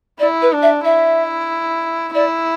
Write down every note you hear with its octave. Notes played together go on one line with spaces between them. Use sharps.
E4 D5
B4
D4
E5
E4 E5
E4 D5